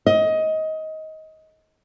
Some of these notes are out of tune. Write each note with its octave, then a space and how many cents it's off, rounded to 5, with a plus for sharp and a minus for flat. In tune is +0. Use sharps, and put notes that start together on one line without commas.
D#5 +20